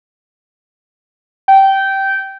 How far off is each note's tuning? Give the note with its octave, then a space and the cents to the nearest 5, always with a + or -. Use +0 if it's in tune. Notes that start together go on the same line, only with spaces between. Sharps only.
G5 -15